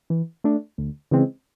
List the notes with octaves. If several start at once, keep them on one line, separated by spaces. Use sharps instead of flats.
E3
A3 D4
D2
C#3 E3 G#3 C4